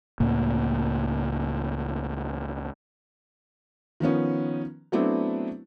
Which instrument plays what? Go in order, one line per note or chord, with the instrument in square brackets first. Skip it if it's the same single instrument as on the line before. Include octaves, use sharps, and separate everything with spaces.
[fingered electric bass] C#2 A2 A#3
[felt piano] D#3 F3 B3 C#4
F#3 A3 B3 C4 D4 E4